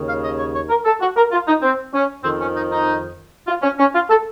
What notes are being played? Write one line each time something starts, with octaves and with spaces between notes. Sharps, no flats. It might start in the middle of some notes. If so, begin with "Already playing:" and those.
Already playing: D#2 C#3
F5
D#5
C#5
C#5
A#4
A4
F#4
A#4
F4
D#4
C4
C#4
F2 D#3 C4
C#4
D#4
D#4
F4
C#4
C#4
F4
A4